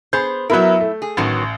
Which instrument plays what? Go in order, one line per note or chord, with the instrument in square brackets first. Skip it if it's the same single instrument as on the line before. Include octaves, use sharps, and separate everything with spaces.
[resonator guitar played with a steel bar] B3 G#4 C5 [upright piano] G6
[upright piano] F#3 B3 A#4 [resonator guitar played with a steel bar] E4 E5
[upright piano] A3
[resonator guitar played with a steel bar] G#4
[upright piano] A1 [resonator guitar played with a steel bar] D#3 F#3 B3